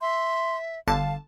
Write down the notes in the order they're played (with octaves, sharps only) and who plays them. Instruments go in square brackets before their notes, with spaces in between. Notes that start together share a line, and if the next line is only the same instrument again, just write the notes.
[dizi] E5 [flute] C6
[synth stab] G1 D3 A5 [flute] F5